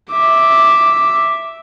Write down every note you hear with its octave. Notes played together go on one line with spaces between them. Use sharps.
E5 D6